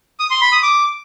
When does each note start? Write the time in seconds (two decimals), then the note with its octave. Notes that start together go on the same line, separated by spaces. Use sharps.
0.20 D#6
0.31 C6
0.41 B5
0.52 D#6
0.63 D6